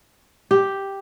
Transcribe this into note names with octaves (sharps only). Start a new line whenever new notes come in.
G4